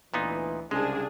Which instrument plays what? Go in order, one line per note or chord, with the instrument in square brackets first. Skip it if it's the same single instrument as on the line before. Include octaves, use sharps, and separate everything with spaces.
[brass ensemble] D2 E3 [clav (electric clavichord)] A#2 B3 D#4
[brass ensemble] C2 [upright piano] C#3 A5 [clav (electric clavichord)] G#3 [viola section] D4 G#4